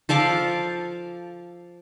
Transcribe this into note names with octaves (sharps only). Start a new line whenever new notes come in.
F3 A4 F5 D6